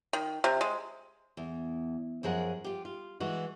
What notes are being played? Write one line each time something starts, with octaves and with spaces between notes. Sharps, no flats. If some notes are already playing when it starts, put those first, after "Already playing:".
D#3
C3
G#3
E2
F#2 F3 G#4 A#4 F#5
F4 G4
F4
E3 G#3 F#4